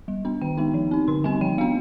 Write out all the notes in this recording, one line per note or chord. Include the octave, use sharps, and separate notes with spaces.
G3
B3 D4
D#3 G5
G#3 B3 D#4
F3
C4 D#4
D3 C6
G3 C4 D#4 G#5
F3 G5
B3 D4 F5